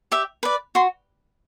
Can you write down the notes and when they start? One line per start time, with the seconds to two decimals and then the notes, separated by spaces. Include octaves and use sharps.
0.12 G4 E5
0.43 B4 D5
0.75 F#4 C6